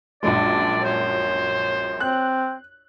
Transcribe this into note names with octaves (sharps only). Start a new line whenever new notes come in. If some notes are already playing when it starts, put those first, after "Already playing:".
A#1 F#2 G#3 D4 D5
C5 C#5
C4 F#6